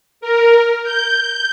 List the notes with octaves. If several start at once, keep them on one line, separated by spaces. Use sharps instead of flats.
A#4
G6